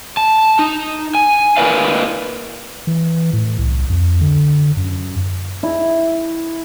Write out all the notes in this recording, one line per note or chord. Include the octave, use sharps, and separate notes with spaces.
A5
D#4
G#5
A#3 E4 A#4 B4 D5 F5
E3
A2
C2
F2
D3
F#2
E4